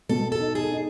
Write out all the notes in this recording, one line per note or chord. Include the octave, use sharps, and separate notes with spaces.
B2 A4
A4
D#4
G#4
D#4